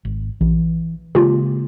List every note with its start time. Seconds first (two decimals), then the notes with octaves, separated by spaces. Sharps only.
0.05 G#1
0.41 A#1 E3
1.15 C#3 G#3 A#3 F4 G4